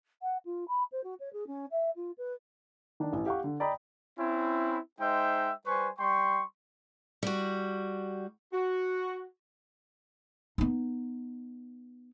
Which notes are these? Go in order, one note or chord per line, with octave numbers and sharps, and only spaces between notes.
F#5
F4
B5
C5
F#4
C#5
G#4
C#4
E5
F4
B4
D#3 D4
A1
G4 F5 F#5 C#6
D3
D5 D#5 G5 A#5 B5 D#6
C4 C#4 E4
G#3 D#4 C5 E5 G5
G3 B4 C5 G#5 C#6
G3 G5 C6 C#6
G3 F#4
F#4
B3 D#4